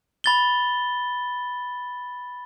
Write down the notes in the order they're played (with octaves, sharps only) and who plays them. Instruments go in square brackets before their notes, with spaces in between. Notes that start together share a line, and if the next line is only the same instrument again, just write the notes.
[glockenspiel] B5 A6 G7